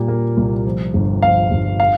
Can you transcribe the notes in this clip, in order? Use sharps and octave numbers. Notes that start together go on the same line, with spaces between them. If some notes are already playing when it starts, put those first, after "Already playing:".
Already playing: A#2 G3
A#3
C2
F3
G1
F3 F5
G1
F5